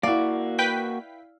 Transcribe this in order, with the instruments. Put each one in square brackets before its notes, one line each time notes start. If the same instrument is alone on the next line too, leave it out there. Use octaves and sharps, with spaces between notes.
[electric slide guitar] A#3 F#4 [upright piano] E4 F5 [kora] D5
[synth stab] B4 G5 B6